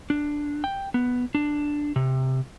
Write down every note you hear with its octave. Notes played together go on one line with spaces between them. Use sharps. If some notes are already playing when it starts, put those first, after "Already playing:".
D4
G5
B3
D4
C3